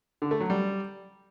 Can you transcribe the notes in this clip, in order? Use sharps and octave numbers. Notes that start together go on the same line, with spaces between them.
D3
A3
F#3
G3